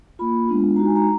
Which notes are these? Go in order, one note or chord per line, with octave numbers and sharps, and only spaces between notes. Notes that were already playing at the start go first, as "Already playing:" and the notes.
A#3 F4 B5
G#3 B3 D4 F4
G#3 D#4 F#4 A#5
G#5
A#5